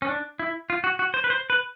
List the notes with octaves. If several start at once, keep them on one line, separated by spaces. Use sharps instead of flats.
C#4
D4
E4
F4
F#4
F#4
C5
B4
C5
B4